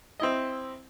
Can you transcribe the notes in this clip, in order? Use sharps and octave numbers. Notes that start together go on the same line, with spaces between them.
C4 E4 D#5